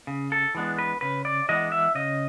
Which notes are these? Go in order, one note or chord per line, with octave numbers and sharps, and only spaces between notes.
C#3
A4
E3 G#3 B3 D4
B4
C#3 B4
D5
E3 G#3 B3 D4 D#5
E5
C#3 D#5